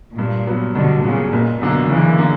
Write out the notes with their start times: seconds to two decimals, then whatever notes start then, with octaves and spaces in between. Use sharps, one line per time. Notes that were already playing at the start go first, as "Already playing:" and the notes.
0.18 G2 A#2
0.47 F#3 B3
0.75 G2 B2 D3
1.04 A#2 C#3 F#3 B3
1.33 F#1 A#2
1.61 F#2 B2 D3 A#3
1.89 F#1 C#3 E3
2.18 D3 A#3